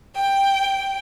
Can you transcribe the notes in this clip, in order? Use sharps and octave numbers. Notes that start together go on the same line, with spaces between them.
G5